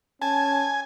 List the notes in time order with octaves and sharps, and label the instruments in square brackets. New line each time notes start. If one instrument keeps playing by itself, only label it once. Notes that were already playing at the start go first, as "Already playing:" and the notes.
[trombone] C#4 [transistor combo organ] G#5 [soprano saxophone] A5